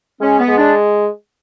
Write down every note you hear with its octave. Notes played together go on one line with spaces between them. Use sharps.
G#3 C#4
B3
G#3
D4